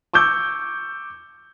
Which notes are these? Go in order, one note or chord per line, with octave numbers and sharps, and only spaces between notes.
C#6 D6 E6 G6